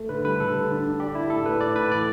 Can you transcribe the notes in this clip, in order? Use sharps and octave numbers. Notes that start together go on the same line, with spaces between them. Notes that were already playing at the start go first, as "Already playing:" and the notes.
Already playing: A3
D3 B4
G3 B4
D3 A4
D3
D4
D4
G4 D5
E4 D5
A2 A4
A2 B4
A2 D5
A2 B4
E3 D5